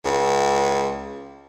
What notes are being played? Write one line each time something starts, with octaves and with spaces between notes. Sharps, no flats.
C#2